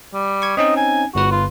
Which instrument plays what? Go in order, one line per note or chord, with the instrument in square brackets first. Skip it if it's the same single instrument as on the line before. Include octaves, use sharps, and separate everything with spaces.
[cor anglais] G3
[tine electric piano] C#6 G#6
[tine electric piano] C4 C#4 D#4 [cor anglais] D#5
[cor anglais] G#5
[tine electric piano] G1 B4 [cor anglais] F#4
[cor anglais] F4